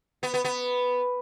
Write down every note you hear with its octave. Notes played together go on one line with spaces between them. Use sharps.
B3
B3
B3